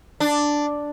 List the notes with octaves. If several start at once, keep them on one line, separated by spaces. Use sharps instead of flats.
D4